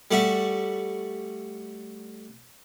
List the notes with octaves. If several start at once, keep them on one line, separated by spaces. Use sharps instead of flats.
G3 A3 F#4